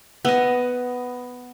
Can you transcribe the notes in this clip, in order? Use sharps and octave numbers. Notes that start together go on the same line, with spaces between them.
B3 D#5